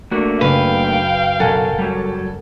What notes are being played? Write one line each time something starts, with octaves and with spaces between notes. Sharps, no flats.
A3 A#3 D4 F#4
F#1 B4 F5 G5
B2 F#3 A4 A#4 F#5 G#5
F#3 G3